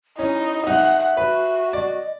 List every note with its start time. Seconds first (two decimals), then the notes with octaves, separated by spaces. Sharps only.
0.19 C#4 D#4 E4
0.67 D#4 E5 F#5
1.17 F#4 B4
1.73 D5 D#5